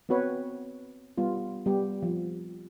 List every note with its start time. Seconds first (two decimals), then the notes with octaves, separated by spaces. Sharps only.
0.09 B3 C4 F#4 B4 C#5
1.18 G3 B3 F4
1.66 G3 B3 G4
2.03 F3